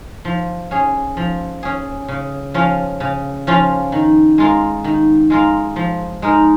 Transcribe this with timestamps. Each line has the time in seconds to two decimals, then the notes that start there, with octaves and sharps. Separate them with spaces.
0.25 F3
0.71 C#4 G#4
1.17 F3
1.63 C#4 G#4
2.09 C#3
2.54 F3 C#4 F4
3.00 C#3
3.47 F3 C#4 F4
3.92 D#3
4.38 G#3 F4 A#4
4.84 D#3
5.30 G#3 F4 A#4
5.76 F3
6.22 G#3 D#4 A#4